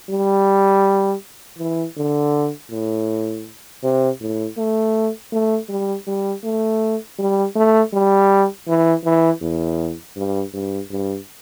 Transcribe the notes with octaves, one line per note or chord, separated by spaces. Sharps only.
G3
E3
D3
A2
C3
A2
A3
A3
G3
G3
A3
G3
A3
G3
E3
E3
E2
G2
G2
G2